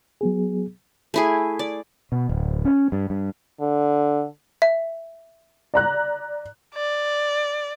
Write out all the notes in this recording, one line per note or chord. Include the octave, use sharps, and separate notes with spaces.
F#3 B3 G#4
A3 E4 G#4
D5
B2
D1
C#4
G2
G2
D3
E5
D5 A#5 F#6
D5